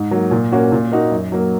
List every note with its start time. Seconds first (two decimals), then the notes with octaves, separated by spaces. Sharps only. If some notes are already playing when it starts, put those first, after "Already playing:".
Already playing: G#2
0.11 F#3 A#3
0.31 A#2
0.52 A#3 C#4 F#4
0.72 A#2
0.92 A#3 D#4 F#4
1.12 F#2
1.32 F#3 A#3